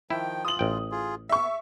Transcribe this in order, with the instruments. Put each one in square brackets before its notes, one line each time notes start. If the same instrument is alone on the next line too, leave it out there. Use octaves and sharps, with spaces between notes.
[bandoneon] D#3 F3 G5 [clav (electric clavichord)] E4
[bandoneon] E3 F4 [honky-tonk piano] D#6 F#7
[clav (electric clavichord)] A1 G5
[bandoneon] F4 G#4
[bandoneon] B3 [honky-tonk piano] E5 C#6